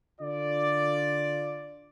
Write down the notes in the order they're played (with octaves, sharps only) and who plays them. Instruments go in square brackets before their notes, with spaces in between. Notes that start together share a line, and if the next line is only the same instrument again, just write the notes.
[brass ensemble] D3 F4 D5